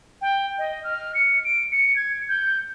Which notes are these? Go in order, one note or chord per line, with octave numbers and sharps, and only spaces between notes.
G5
D#5
F6
C#7
D7
C#7
G#6
G6